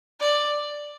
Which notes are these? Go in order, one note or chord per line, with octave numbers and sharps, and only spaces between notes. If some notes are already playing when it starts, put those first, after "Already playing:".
D5